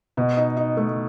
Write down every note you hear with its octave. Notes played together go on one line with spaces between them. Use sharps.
B2
D#4
D#4
A3